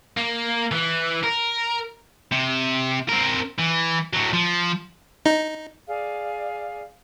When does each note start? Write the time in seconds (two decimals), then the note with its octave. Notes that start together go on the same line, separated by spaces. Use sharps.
0.17 A#3
0.72 E3
1.23 A#4
2.32 C3
3.09 C4 A#4
3.59 E3
4.13 A2 F#3
4.33 F3
5.26 D#4
5.88 G#4 D5 F5